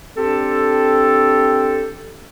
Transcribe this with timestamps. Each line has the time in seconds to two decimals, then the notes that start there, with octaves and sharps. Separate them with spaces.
0.17 C4 D4 G4 A4